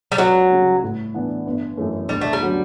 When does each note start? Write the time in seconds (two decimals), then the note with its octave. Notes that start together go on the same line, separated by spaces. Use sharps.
0.12 G3
0.18 C#2 F#3
0.50 C#3 G3 C#4
0.82 A2
1.14 E3 B3 D4
1.46 G1
1.77 F#2 E3 A3 C#4
2.09 D2 G3
2.21 A3
2.33 G3
2.41 D3 F#3 C#4